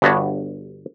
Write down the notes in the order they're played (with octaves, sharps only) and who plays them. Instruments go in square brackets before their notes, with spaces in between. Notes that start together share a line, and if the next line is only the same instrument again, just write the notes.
[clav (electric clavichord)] G1 G2 B3 D4 F#4 C#5